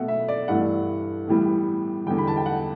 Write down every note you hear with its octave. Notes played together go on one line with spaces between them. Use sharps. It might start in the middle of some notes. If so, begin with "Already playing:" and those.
Already playing: B2 A3 F#5
E5
D5
G2 E3 A3 F#5
A2 E3 G3 B3
E2 D3 G3 G5
B5
A5
G5
F#5